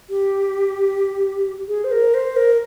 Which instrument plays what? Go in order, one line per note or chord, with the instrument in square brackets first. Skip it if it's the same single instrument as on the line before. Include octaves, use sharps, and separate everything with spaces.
[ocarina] G4
G#4
C5
A#4
C5
A#4